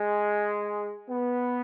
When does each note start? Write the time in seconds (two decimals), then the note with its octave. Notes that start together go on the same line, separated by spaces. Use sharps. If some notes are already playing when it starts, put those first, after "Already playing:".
Already playing: G#3
1.08 B3